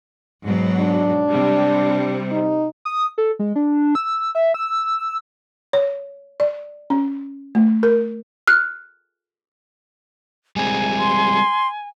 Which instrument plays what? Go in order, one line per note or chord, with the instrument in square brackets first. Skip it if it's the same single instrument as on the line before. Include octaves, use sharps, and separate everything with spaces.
[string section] G#2 B2 F#3
[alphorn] D4
[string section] C3 G3
[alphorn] D#4
[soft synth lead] D#6
A4
G#3
D4
E6
E5
E6
[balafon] C#5
D5
C#4
A3
A#4
[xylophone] F6 F#6
[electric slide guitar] G3 G#3 C4 [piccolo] G#5
[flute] C6